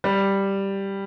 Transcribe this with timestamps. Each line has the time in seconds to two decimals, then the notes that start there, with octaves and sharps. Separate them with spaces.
0.04 G3